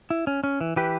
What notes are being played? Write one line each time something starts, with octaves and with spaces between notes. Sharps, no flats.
E4
C#4
C#4
E3
E3 G4 B4